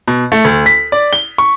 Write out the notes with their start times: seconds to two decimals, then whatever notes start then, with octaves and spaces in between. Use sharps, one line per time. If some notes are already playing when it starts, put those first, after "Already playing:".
0.08 B2
0.32 A3
0.45 D2
0.66 B6
0.92 D5
1.13 G7
1.38 C#6